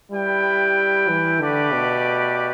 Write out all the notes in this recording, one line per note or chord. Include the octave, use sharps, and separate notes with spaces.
G3 E4 B4 G5
E3
D3 A3 G4 B4 D5
B2